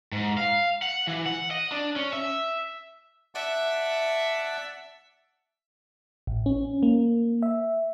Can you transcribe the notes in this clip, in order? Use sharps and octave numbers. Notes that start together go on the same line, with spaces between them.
G#2
F5
F#5
E3
F#5
D#5
D4
C#4
E5
D5 E5 F#5 A5
A1
C#4
A#3
E5